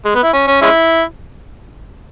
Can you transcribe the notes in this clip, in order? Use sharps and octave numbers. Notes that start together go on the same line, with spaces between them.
G#3
B3
E4
C#4
C#4
G#3 C#4 E4